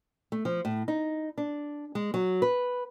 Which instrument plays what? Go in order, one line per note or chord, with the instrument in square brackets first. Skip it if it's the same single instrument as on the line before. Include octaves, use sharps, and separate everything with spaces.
[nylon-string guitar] A3
F3
A2
D#4
D4
G#3
F#3
B4